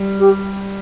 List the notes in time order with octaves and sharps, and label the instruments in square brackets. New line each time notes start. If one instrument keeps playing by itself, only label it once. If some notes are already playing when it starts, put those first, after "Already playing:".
Already playing: [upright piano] G3
[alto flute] G4